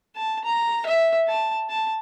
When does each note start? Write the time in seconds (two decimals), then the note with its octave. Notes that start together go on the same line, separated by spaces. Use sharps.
0.16 A5
0.44 A#5
0.86 E5
1.28 A5
1.70 A5